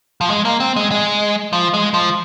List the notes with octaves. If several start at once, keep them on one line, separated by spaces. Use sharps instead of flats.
F3
G#3
A#3
C4
G#3
G#3
F3
G#3
F3